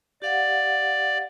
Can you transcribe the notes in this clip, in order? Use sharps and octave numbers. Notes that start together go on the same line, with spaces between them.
G4 D5 F5 F#5